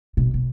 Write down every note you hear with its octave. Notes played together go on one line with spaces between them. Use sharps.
B2
B2